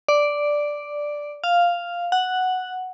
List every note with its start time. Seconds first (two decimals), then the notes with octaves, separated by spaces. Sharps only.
0.09 D5
1.44 F5
2.12 F#5